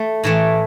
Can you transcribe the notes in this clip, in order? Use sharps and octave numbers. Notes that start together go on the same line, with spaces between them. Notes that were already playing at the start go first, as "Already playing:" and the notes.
Already playing: A3
A2 E3 A3